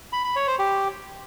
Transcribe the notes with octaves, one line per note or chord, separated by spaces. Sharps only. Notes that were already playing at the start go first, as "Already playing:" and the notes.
B5
B5
C#5
C5
G4